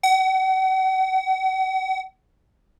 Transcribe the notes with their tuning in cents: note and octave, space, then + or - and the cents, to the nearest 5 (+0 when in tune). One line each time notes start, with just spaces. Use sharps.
F#5 +40